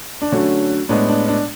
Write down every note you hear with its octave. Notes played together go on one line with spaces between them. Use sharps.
D4
D3 F#3 A3 C#4
A2 G#3 B3 D4
D4
D4